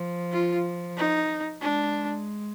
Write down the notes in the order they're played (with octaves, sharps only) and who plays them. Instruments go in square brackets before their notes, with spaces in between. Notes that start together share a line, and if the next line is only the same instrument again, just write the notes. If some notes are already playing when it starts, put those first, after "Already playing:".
Already playing: [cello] F3
[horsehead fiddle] F4
D#4
[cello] G#3 [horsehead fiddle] D4